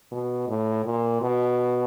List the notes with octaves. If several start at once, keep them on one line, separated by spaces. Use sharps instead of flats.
B2
A2
A#2
B2